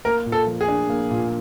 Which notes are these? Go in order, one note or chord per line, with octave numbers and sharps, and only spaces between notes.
A#3 A#4
A#2
A4
F3
G#4
D4
A#3
A#2